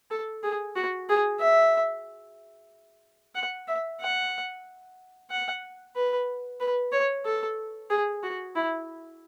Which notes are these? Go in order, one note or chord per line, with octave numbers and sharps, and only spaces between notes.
A4
G#4
F#4
G#4
E5
F#5
E5
F#5
F#5
B4
B4
C#5
A4
G#4
F#4
E4